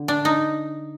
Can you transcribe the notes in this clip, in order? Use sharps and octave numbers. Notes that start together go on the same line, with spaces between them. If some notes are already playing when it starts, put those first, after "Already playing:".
Already playing: D3
D4
D#4